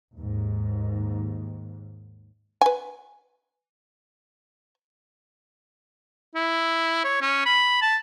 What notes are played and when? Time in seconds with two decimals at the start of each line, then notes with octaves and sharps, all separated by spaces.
0.15 D#2 G#2
2.61 B4 G#5
6.35 E4
7.04 C#5
7.22 C#4
7.46 B5
7.82 A5